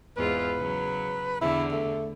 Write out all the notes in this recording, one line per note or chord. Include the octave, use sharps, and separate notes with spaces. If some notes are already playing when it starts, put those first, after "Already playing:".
E2 G#2 F4 B4
C#3 F#3
E2 D3 E4
A3